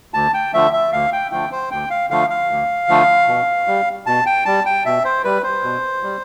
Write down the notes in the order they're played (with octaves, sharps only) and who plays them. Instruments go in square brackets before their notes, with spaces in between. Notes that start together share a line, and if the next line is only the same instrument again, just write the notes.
[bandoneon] D2 A5
G5
D3 F3 A3 E5
E5
D2 F5
G5
D3 F3 A3 G5
C5
D2 G5
F5
D3 F3 A3 F5
F5
D2
D3 F3 A3
B2
G3
B2 A5
G5
G3 A5
G5
B2 E5
C5
G3 B4
C5
B2
G3